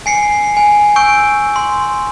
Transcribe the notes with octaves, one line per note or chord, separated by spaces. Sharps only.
G#5 C7 C#7
G#5
C#6 E6 G6 D7
C6